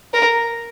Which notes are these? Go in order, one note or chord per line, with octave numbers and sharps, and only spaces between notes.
A#4